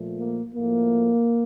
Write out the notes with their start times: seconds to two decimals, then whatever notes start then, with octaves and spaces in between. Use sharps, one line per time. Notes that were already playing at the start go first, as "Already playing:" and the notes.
Already playing: A#2 F3 A3
0.19 A#3
0.55 A2 F3 A3 A#3